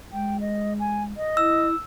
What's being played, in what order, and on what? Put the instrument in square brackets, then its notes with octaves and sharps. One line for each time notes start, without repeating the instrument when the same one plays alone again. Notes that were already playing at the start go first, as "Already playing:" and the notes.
[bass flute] G#3 [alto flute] G5
[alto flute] D#5
G#5
D#5
[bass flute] E4 [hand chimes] E6